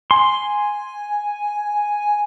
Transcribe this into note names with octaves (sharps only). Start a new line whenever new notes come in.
G#5 C6